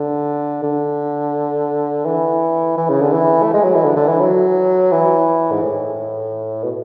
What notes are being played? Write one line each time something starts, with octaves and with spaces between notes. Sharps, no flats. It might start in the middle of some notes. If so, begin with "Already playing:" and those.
Already playing: D3
D3
E3
E3
C#3
D3
E3
A3
G#3
F#3
E3
D3
D3
E3
F#3
E3
G#2
A2
B2